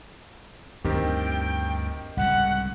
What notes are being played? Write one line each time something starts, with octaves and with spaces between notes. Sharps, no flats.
D2 G2 D#3 C4 G4 G5
C2 G#2 C#3 F#5